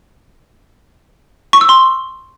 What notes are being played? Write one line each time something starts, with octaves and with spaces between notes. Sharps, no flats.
C#6
E6
C6